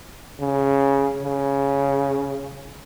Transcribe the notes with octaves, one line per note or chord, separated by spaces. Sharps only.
C#3
C#3